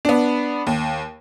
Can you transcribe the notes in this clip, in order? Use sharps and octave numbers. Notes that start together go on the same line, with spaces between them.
B3 D4
D#2